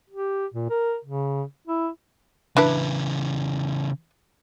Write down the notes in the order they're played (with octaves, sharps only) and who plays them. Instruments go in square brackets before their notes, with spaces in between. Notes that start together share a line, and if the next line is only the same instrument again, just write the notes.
[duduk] G4
A#2
A#4
C#3
E4
[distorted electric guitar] C#3 E3 [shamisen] D4 E4 B4